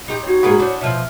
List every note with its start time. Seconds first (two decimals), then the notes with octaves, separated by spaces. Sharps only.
0.08 D#4 G4 B5 C6
0.23 F#4 C#5
0.43 G#2 A#3 G#4 F#5 B5 D#6
0.59 D4 E4 C5 C#5
0.81 B2 F3 E5 F6